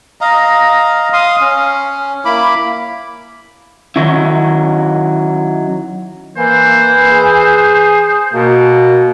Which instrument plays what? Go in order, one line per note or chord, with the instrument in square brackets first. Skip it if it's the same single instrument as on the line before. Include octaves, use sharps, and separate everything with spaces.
[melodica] D#5 F5 A#5
F5 C6 D#6
C#4
A#3 E4 B5 D6
[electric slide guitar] D#3 F#3 C#4 E4
[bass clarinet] E3 [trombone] A#3 [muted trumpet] C5
[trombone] G#4
[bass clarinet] B2 [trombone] A#3